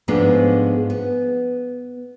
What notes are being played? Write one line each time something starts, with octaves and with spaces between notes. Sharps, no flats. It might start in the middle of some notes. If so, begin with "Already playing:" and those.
G#2 F3 G#3 A3 B3 D4
B3